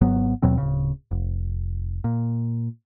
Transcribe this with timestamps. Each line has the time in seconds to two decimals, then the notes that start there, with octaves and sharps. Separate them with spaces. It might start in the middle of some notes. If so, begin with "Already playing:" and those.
0.01 G#1 G#2 F#3 B3
0.42 D#2 B2 F#3 C4
0.58 D1 A#1 C#3
1.11 F1
2.04 A#2